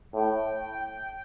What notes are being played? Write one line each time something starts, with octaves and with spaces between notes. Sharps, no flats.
A2 G5